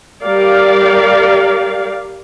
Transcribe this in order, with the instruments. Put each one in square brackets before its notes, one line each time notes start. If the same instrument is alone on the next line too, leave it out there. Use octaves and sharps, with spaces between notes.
[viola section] G3 G4 A#4 D5 F5